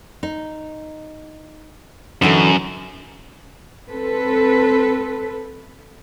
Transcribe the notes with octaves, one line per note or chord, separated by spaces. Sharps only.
D#4
F#2 D3 E3 D#4
C4 A4 B4